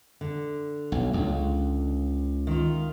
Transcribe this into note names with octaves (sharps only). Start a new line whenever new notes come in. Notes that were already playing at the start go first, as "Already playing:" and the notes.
D3
B1
C#2
D#3 F4